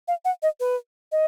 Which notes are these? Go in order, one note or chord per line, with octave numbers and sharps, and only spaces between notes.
F5
F#5
D#5
B4
D#5